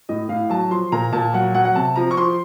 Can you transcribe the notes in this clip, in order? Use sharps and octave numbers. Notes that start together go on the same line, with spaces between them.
A2 D#5
A2 F5
F#3 A5
F3 C6
A#2 A#5
A#2 A5
F#3 F#5
F#3 F#5
F#5
C3 A5
F3 A#5
C#6
F3 C6